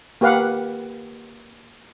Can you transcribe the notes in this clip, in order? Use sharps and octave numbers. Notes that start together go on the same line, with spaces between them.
A#3 G4 B4 F5 F#5